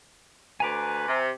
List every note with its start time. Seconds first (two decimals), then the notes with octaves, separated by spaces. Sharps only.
0.60 D2 B4 G#5 A#5 D6
1.07 C3